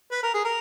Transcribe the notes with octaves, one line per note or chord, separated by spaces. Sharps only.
B4
A#4
G#4
A#4